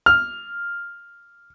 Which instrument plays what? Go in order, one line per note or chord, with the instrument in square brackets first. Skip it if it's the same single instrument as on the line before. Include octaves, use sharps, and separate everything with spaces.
[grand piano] F6